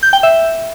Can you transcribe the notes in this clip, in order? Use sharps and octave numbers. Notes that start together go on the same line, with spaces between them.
G6
G5
E5